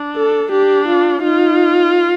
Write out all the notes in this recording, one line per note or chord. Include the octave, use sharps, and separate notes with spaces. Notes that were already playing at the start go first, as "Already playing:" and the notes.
Already playing: D4
A4
D4 G4
F4
D#4 F4